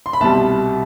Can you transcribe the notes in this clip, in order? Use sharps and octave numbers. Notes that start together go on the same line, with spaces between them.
C6
B5
C2 B2 G3 A5